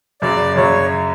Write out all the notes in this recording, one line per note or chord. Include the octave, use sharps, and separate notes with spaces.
F#2 C#3 F#3 D5
F#2 C#3 F#3 C#5